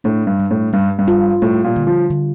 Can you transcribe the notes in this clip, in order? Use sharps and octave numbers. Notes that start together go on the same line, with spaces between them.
A2 D4
G2
G3
A2
G2 G3
G2
F4
A2 G3
A#2
D3
F3
D3